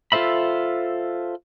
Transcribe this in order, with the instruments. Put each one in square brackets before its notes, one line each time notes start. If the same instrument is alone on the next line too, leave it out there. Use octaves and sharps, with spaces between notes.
[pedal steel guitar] F4 A4 C5 E5 B5